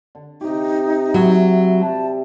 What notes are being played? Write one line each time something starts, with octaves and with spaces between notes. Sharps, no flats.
D3
C3 D#4 G4
F#3 E4 F#4 D5
G4 D5 A5